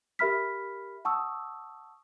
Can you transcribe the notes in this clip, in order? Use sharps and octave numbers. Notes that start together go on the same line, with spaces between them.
G4 A#4 E5 B5 F6 B6
F#5 A5 C#6 D#6 E6